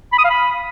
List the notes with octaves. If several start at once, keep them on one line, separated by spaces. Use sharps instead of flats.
B5
D#6
F5
B5